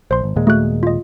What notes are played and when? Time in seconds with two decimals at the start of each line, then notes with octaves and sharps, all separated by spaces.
0.11 A#1 C5 C6
0.24 G#1
0.36 D#2 A#2 G#3
0.47 A3 F#4 F#6
0.83 F4 D#5